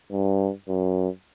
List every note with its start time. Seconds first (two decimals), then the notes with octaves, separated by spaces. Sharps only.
0.11 G2
0.68 F#2